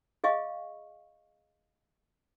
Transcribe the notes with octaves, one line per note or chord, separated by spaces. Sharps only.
G#4 D#5 F5 C#6